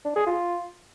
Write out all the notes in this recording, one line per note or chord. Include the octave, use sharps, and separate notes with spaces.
D4
G#4
F4